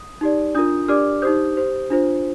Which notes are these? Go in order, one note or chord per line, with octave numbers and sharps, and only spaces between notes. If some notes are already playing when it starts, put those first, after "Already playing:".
Already playing: D#6
D#4 G4 D5
D4 F4 A#4 D#6 G6
D4 G4 A#4 D5 D6 F6
D#4 G4 C5 D#6 G6
G4 C5
D4 F4 C5